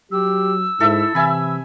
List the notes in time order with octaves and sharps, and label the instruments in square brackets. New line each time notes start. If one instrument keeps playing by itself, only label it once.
[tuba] F#3 [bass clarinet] G4 [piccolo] E6
[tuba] G#2 [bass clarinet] E4 [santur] A4 E5
[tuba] C3 [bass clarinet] E3 [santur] E5 G#5 B5